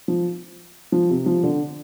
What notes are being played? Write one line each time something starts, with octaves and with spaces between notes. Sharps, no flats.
F3
F3
C3
F3
D3